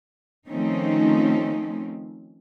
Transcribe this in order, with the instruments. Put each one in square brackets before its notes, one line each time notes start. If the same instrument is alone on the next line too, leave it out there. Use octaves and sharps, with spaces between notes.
[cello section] D#3 F3 A3 C4 C#4 D#4